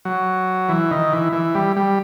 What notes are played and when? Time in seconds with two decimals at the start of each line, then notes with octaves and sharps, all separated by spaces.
0.05 F#3
0.69 E3
0.91 D#3
1.12 E3
1.33 E3
1.55 G3
1.76 G3